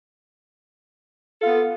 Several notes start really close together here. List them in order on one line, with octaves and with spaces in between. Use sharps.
A4 F4 B3